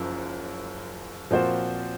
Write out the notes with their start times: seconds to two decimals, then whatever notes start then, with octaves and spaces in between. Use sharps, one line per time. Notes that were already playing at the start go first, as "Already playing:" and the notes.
Already playing: F#1 F#2 F3
1.31 A#2 F3 C4 F#4 C5